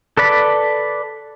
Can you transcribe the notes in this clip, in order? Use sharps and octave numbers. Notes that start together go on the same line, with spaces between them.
A4 B4 D5 B5